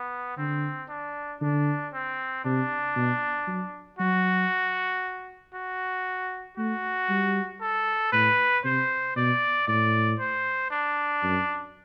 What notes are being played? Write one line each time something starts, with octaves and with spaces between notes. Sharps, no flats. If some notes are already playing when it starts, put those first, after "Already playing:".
Already playing: B3
D3 C4
D4
D3 D4
C4
C3 D4
B2
F#3
F#3 F#4
F#4
A3 F#4
G3
A4
A2 B4
C3 C5
B2 D5
A2 D5
C5
D4
F#2